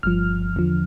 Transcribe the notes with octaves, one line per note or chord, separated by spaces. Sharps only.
G1 G2 F3 F6
E2 D3 F3